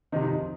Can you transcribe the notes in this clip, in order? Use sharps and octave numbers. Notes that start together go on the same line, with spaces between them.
F2 C3 D#3 D#4